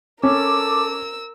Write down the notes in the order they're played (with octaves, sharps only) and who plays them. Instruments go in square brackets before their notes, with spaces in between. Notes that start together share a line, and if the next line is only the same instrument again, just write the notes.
[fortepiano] C#4 [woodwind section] A4 A5 D6 [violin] A#4 E6